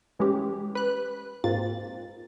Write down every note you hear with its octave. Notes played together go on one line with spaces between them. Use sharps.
E3 G#3 C#4 G4
B4 F#6
G#2 A#3 C4 F4 A6